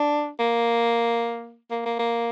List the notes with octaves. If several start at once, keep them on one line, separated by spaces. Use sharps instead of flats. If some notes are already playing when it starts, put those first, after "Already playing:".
Already playing: D4
A#3
A#3
A#3
A#3